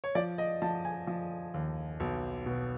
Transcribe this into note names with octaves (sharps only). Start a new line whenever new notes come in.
C#5
F3 D5
D#5
F3 A5
G#5
F3
D#2
B1
B2